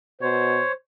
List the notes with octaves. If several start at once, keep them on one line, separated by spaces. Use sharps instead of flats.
B2 C5 C#5